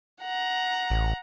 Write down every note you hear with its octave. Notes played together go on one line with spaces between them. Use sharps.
F#5 A#5
A1